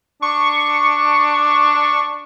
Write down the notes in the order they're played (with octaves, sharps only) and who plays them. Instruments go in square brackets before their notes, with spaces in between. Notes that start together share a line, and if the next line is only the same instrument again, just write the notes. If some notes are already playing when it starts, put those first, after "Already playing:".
[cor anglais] D4 [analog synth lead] C#6